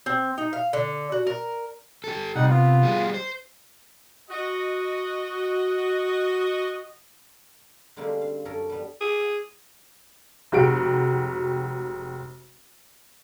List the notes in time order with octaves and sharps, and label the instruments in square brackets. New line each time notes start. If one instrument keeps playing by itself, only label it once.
[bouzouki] C4
D#4
F5
D3
F#4
A#4
[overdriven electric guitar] G4 A4
[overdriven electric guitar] C3 [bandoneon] G3 D#4 F#5
[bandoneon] B3 F4
[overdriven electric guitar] G3 G#4
C5
[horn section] F#4 D#5
[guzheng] D3 G3 G#3 A#3 C4 C#4
F5
F#2 C#4 A4 A#4
G3 B3
[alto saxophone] G#4
[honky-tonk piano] F1 G#3 F#4 G4 D7